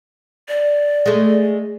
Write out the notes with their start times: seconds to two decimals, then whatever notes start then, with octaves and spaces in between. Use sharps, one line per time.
0.48 D5
1.06 G#3 A3